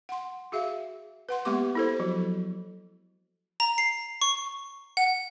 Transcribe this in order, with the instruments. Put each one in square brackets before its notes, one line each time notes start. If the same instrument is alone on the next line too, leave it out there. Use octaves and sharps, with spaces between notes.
[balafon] F#5 C6
F#4 G#4 E5 F5
B4 F#5 C6
G#3 A#3 B3 G4 C6 D6
E4 A4 C5
F3 F#3 F#4
[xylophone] A#5
C7
C#6
F#5